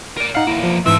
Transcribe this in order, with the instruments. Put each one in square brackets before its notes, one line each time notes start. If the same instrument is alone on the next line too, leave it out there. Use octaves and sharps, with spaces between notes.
[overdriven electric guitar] A#4 D5
[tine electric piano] D#4 F5 [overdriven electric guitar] F#5
[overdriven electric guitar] E2 A#3 [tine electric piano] E4
[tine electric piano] F3
[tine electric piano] G#2 E3 [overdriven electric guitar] A3 C4 [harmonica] E5